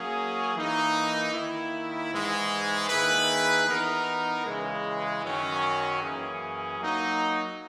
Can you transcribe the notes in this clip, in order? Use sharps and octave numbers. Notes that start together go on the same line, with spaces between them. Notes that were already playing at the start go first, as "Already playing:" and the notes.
Already playing: F#3 A#3 C#4 G#4
E3 A#3 D#4
D#3 A#3 E4
G#2 E3 G#3
D#3 A#3 E4 G#4 B4
E3 B3 D#4 A#4
C#3 E3 G#3
F#2 D#3 F#3 C#4
F#2 E3 A#3 C#4 G#4
F#3 A#3 D#4